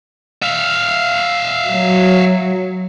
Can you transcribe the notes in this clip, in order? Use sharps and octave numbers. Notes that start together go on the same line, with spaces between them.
E5 F5
F#3